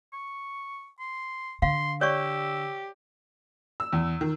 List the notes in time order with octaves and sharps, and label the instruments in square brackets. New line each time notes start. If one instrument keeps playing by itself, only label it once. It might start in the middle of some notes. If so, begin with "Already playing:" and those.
[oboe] C#6
C6
[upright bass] D3 [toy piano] F5 [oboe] C6
[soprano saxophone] G4 [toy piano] C#5 D5 C#6 [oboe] E6
[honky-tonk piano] E6
E2
D#3